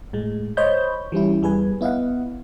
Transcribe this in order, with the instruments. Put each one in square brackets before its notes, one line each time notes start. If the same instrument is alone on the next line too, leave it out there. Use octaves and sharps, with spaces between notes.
[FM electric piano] A2 G#3
C5 C#5 D#5 B5 G6
E3 G3 C#4 E4
E2 G3 G#4 B4 G#5
B3 E4 D#5 F5 F#5